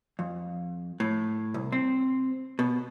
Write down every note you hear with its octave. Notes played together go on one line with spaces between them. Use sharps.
F2
A2
C2
C4
B2